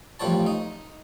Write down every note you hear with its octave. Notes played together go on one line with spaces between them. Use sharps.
A1 F3 G3 C#5 A5
D#4